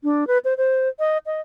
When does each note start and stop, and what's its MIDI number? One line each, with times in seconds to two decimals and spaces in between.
0.04 0.27 62
0.27 0.38 71
0.45 0.54 72
0.58 0.88 72
0.99 1.18 75
1.26 1.41 75